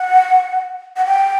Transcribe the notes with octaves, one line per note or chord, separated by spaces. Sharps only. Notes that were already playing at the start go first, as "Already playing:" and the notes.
Already playing: F#5
F#5
G5